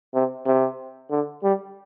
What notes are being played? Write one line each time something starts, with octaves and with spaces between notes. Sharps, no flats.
C3
C3
D3
G3